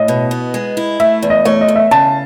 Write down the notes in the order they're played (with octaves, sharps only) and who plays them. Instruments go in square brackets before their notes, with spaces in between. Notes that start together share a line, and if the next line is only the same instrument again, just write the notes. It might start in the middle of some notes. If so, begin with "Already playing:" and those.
Already playing: [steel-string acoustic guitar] A2 [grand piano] D#5
[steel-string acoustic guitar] B2
B3
G#3
E4
[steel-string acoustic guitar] A3 [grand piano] E5
[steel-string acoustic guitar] E2
[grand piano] D#5
[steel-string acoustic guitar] A3 [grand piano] C#5
[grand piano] D#5
[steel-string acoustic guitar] E2
[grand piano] E5
[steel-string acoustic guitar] C#3 [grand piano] A5